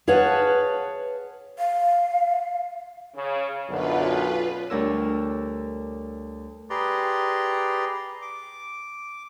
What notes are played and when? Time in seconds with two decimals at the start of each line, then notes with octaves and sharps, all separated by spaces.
0.08 G#4 B4 C#5 F5 F#5 A5
1.59 F5
3.16 C#3
3.69 B1 F#2 D3 F4 B4
4.70 D2 G3 D4 A#4 C#5 E6
6.70 G4 G#4 B4 D5 A#5 C6
8.22 D6